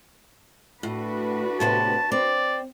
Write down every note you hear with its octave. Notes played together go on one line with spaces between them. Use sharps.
A2 D4 F#4 B4
A2 C3 B3 A5
C4 D5